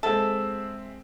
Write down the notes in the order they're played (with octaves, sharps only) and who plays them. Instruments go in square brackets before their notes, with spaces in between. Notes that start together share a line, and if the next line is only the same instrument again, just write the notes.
[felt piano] G#3 C4 E5 [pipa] A4